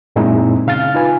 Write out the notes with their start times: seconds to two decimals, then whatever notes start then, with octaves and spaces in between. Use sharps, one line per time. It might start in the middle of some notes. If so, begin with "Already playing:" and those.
0.16 F#2 A#2 G#3 C4 D#4 E4
0.67 C#3 F5 F6 A6
0.94 D#4 F4 B4 G#5